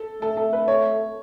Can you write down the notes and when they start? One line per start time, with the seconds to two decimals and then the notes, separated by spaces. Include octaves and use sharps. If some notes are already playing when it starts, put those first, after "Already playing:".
Already playing: A4
0.22 A3 A4
0.37 A4
0.53 B4
0.68 C#5